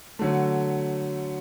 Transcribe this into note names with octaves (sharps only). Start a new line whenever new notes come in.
D3 F#3 A3